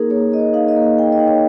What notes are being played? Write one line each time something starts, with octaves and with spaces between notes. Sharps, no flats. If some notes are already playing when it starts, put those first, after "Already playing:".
Already playing: A#3 D#4 G#4 A#4
A#3 C#5
A#3 D#5
C#5
D#4 F5
D#5
A#3
F5
A#3 G5
D#5
D#4
C#5